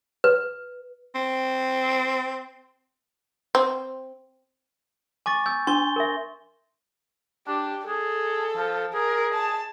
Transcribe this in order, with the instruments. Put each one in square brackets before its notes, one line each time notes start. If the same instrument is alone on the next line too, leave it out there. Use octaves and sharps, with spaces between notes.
[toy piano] B4
[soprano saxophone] C4
[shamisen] C4
[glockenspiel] G#5 C#6 A6 [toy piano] D6
[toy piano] E6 [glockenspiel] G6
[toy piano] D4 [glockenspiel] G#5 C6 G7
[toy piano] A#4 E5
[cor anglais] D4 [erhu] G4
[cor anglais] G#4 [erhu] A4
[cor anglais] F3
[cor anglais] G#4 [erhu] A#4
[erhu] A5